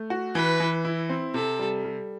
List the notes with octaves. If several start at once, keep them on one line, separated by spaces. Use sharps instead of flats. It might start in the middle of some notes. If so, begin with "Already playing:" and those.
Already playing: A3
F#4
E3 B4
E3
E4
C4
C3 A4
G3
G3